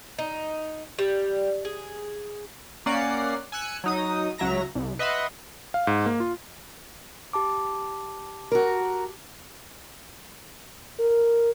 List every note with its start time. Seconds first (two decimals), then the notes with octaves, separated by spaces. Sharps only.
0.19 D#4
0.99 G3
1.65 G#4
2.86 A#3 C#4 D5 F#5 C7
3.52 G#5 E6 F#6 C#7
3.84 F#3 D#4 D#6
4.38 C#2 F#3 E5 A#5 A#6
4.75 C2
4.99 B4 D#5 E5 F#5 C6
5.74 F5
5.87 G#2
6.06 A#3
6.20 F4
7.33 G4 A5 D6
8.52 F#4 A#4
11.00 A#4